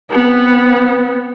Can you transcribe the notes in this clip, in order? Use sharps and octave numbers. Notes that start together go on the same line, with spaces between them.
B3 C4